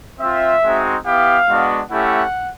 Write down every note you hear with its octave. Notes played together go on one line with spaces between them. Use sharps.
C4 F4 E5
G#3 C4 D#4 F#4
B3 E4 G4 F5
G#3 B3 D4 F#4
A3 C#4 E4 G4 F#5